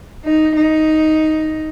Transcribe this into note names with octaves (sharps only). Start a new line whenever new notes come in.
D#4
D#4